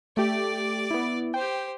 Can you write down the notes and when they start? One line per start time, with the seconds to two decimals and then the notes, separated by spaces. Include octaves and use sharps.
0.17 A3 G4 D5 D6
0.91 B3 E4
1.34 G4 C5 G5